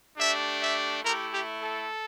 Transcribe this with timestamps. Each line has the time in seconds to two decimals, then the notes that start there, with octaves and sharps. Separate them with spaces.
0.17 A3 D4 G4 E5
0.60 E5
1.03 A3 E4 G4 A#4
1.31 G4
1.61 A4